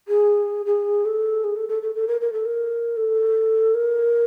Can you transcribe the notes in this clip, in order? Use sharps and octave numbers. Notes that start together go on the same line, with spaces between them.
G#4
G#4
A4
G#4
A4
A4
A4
A4
A#4
A#4
A4
A#4
A4
A#4